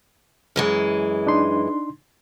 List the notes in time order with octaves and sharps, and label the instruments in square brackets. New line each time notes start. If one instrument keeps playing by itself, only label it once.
[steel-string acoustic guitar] F#2 E3 G#3
[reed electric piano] D4 D#4 C6